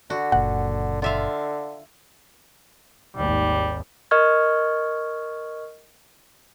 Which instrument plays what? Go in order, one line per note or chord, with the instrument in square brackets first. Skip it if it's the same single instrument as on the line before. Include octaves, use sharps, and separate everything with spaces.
[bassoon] D3 [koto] F#4
[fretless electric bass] F#1 A#2 [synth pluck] F#5
[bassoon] D3 [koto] F4 E5 F5
[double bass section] G#1 D#2 [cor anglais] G3
[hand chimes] A#4 D#5 C#6 F6 G#6